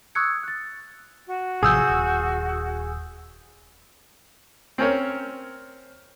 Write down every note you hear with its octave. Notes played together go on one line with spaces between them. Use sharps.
C#6 D#6 E6 F#6 G#6 C#7
F#6 A6
F#4
A1 C3 F3 G#4 D#6 E6 G6
D#1
C4 C#4 A#4 C#5